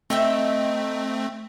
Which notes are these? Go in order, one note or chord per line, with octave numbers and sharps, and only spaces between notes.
A3 C4 D#4 E5 G5